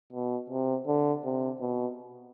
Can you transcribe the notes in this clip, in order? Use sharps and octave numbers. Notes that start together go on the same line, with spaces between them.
B2
C3
D3
C3
B2